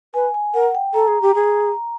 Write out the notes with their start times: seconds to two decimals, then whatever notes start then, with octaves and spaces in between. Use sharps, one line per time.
0.14 B4 G#5
0.34 G#5
0.54 A#4 F#5
0.75 G5
0.94 A4 A#5
1.08 G#4
1.22 G4
1.35 G#4